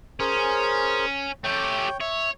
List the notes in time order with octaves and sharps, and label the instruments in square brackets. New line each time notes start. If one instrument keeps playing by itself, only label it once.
[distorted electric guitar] C#4 [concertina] G#4 A#4 C5
[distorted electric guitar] A3 G4 [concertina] C#5 G5
[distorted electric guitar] C#5 [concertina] E5